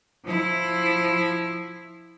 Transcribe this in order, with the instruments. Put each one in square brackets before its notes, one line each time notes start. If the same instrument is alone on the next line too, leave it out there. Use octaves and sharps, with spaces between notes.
[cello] F3 E4